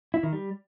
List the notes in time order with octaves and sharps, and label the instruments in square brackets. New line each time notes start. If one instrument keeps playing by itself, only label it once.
[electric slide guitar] E4
D#3
G3